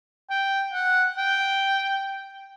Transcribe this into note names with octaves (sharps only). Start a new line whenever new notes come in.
G5
F#5
G5